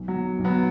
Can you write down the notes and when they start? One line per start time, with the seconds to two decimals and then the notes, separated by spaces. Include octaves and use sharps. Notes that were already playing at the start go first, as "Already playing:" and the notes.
Already playing: B1
0.08 F#3
0.14 B2
0.39 B1
0.44 F#3 B3